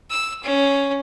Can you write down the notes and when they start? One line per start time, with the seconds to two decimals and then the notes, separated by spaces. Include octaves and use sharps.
0.10 E6
0.43 C#4